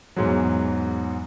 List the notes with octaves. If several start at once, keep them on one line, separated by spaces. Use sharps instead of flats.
E2 G#2 F#3